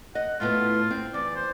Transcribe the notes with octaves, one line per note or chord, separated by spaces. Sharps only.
D#5 F#5
A2 A3 B3 F4
C4
E2 D5
C5